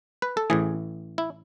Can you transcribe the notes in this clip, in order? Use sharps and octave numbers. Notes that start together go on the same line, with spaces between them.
B4
A4
A1 A2 E3 G#4
E4